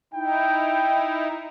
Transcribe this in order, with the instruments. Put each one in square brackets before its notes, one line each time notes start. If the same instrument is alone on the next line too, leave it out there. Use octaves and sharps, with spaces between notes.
[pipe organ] D#4 E4 [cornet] G5